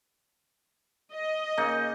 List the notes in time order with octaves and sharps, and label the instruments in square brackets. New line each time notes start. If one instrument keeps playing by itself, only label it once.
[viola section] D#5
[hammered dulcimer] C#3 A#3 D#4